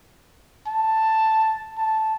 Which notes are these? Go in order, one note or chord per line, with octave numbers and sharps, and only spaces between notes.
A5
A5